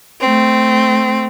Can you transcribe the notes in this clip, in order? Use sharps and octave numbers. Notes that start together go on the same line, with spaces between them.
A3 C4